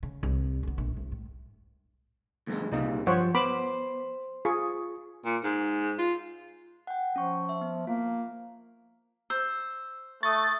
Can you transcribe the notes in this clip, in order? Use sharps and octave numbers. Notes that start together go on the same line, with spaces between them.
C#3
C2
D3 B3
A#1
C2
A2
D2 G2 G#3
C2 A#2 C#3 G3 D#4
G2 F3 C5 C#5 F#5
B3 C5 B5 D6
F4 G#4 C#6
A#2
G#2
F4
F#5 G5
F3 C#4 C#6
E5
B3
A#3 F4
C5 E6
A3 C#6 D#6 A6